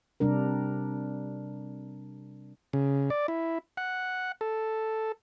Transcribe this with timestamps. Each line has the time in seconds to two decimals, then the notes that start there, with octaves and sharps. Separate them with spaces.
0.20 C3 G3 D4 A#4
2.73 C#3
3.10 D5
3.28 E4
3.77 F#5
4.41 A4